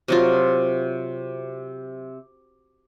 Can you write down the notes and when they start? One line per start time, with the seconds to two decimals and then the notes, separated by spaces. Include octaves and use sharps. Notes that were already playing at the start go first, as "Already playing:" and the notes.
0.08 C3 F#3 F4